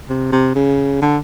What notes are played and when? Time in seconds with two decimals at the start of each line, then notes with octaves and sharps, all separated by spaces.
0.09 C3
0.32 C3
0.55 C#3
1.02 D3